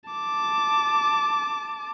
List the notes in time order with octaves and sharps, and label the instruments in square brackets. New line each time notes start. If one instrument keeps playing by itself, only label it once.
[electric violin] A5 D6